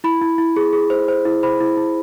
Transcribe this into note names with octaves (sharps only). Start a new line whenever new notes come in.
E4 B5
E4
E4
G#4
G#4
C5
C5
E4
C5 B5
E4
E4